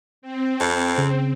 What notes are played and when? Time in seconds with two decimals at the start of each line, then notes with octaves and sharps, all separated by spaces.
0.22 C4
0.60 F2
0.98 C#3